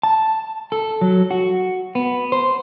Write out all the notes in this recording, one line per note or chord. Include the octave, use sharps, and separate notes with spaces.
A5
A4
F#3
F#4
B3
C5